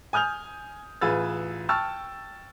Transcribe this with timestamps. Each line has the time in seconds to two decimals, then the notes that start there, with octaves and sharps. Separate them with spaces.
0.13 G#5 D#6 F6 G6 F7
1.01 A1 F4 G#4 B4 E6 A6
1.69 G5 A5 C#6 E6 F6 A6